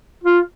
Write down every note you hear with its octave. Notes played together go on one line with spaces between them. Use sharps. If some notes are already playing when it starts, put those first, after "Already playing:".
F4